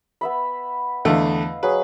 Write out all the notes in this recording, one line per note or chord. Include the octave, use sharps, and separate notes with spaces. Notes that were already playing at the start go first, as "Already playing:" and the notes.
B3 E5 B5
E2 D3 A3 D#5 F5
F#3 G#4 B4